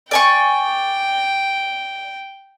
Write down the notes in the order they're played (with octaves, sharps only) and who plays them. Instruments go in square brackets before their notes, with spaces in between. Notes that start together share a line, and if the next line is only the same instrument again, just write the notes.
[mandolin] D5 G#5 C#6 [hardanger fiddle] G5